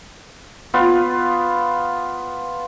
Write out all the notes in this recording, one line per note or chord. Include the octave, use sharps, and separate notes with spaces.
B3 F4